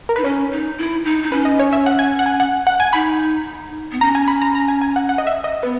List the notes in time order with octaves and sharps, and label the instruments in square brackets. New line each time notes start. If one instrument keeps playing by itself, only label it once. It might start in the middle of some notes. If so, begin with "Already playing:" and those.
[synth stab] A#4
[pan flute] D#4 [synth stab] B4
[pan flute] C#4 [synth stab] C#5
[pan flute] D#4
E4
D#4
D#4
[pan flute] C#4 [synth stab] B4
[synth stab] D#5
C#5
E5
F#5
G#5
F#5
G#5
F#5
F#5
G#5
[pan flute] D#4 [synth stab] B5
[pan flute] B3
[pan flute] C#4 [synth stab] A#5
[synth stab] G#5
B5
A#5
A#5
G#5
G#5
F#5
F#5
D#5
E5
D#5
[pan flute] B3 [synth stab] B4